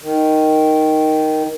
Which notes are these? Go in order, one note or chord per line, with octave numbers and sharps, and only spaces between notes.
D#3